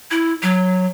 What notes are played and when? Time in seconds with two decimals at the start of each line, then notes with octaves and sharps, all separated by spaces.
0.11 E4
0.43 F#3